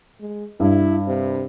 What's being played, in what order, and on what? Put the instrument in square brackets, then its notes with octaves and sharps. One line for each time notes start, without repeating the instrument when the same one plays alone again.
[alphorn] G#3
[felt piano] G2 [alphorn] E4
[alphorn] C3